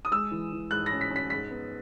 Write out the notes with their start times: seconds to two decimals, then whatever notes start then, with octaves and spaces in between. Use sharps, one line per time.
0.05 D#6
0.11 G#3 E6
0.31 E3
0.52 E3
0.71 G#2 F#6
0.86 A#6
0.92 C#4
1.01 B6
1.11 C#4
1.16 B6
1.30 G#2 B6
1.51 B3